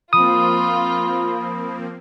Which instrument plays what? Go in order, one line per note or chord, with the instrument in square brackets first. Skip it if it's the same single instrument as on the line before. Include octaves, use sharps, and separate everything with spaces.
[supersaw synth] F3 A#3 C4 [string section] F4 [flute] B5 [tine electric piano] D#6